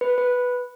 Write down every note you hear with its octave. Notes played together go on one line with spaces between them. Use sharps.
B4
B4